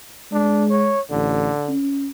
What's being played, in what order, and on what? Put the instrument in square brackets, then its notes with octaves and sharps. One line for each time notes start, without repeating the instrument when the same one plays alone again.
[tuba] G#3 [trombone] D4
[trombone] C#5
[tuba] A1 [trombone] D3
[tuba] C#4